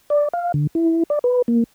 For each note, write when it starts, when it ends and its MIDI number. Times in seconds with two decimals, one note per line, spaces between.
0.10 0.28 74
0.33 0.52 77
0.54 0.67 50
0.75 1.03 64
1.10 1.19 74
1.24 1.42 71
1.48 1.64 58